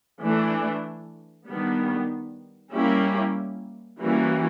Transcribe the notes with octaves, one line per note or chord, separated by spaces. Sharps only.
E3 A3 D4
D#3 G3 B3 D4
G3 A#3 C#4 E4 G4
E3 G3 A#3 C#4 F#4